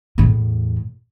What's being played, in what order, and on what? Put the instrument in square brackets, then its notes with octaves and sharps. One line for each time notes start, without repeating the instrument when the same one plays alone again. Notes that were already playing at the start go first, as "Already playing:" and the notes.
[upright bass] E2 A2